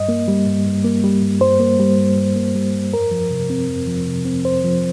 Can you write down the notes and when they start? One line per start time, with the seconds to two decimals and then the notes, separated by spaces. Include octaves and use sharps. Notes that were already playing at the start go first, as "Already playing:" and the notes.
Already playing: G2 D#5
0.09 A#3
0.28 G3
0.46 G2
0.66 G2
0.84 A#3
1.04 G3
1.22 G2
1.41 G2 C5
1.60 A#3
1.80 G3
1.98 G2
2.17 G2
2.36 A#3
2.55 G3
2.74 G2
2.93 F2 A#4
3.11 F3
3.31 C3
3.50 C4
3.69 F2
3.87 F3
4.07 C3
4.25 C4
4.44 F2 C5
4.64 F3